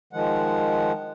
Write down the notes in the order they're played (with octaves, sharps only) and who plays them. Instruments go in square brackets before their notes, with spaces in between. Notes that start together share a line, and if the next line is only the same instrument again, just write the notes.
[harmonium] D#3 F3 G#3 F#5